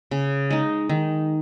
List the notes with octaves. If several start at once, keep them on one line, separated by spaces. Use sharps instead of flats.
C#3
G#3 D#4
D#3